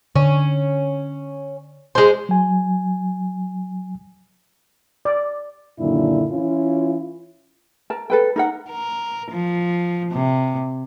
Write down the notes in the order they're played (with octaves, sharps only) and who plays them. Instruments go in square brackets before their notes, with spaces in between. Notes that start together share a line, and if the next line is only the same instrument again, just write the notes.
[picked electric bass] D3 [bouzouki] C#4
[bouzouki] G#3 C5
[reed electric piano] F#3 G#5
[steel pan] D5
[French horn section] F#2 A#2 D3 D#3 D4 E4
E3 C#4 E4 F4
[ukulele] A#4 A5
A4 B4 G5
D#4 A#4 F#5
[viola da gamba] A#4
F3
C3